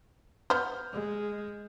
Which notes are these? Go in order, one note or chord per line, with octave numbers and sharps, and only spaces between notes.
B3 C5 F6 G6
G#3